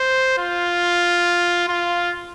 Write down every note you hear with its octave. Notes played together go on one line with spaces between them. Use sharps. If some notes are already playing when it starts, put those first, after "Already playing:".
Already playing: C5
F4
F4